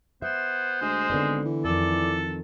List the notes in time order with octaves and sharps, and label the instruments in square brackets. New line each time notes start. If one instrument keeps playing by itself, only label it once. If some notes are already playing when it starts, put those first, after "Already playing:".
[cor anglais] B3 [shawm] C5 [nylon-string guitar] E5
[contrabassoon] D2 [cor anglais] G#3
[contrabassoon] G#1 [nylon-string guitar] D3 B3 D5
[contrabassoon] E3
[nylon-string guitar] F2 D#3 [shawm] A4 [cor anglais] D5